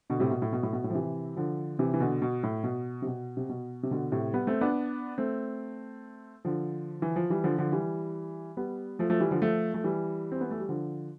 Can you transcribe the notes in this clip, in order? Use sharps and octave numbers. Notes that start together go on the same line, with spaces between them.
B2 D3
A2 C3
B2
A2
B2
A2
B2
A2
F3
C3 E3
D3 F3
C3 E3
E3
B2 D3
B2
A2
B2
C3
B2
C3
B2
C3
B2 D3
A2 C3
G3 B3
A3 C4
B3 D4
A3 C4
D3 F3
E3
F3
E3 G3
D3 F3
D3 F3
E3 G3
G3 B3
F3 A3
F3 A3
E3 G3
D3 F3
F3 A3
A3
E3 G3
C4
B3
A3
G3
D3 F3